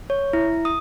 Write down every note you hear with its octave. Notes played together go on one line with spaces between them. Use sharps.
C#5
E4
D#6